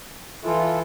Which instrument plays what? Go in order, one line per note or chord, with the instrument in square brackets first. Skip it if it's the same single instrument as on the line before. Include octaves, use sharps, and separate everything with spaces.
[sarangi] E3 [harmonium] F4 A4